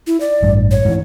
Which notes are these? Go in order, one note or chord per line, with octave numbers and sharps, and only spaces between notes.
E4
D5
A1 G2
C#5
G#2 E3